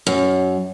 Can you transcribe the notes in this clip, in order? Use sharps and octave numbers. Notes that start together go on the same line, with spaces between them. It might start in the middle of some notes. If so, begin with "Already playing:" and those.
F#2